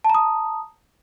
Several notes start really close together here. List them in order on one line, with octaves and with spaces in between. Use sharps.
A5 A#5 D#6